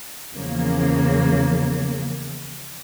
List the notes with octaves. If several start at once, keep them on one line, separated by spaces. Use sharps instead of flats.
E2 C#3 F3 A#3